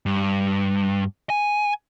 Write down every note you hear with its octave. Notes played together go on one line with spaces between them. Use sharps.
G2
G#5